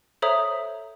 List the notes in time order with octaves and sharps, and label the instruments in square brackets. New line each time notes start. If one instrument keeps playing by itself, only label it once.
[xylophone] A4 C5 C#5 E5 A#5 D#6